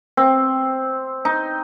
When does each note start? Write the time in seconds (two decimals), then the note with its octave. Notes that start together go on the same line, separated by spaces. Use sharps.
0.17 C4
1.25 D#4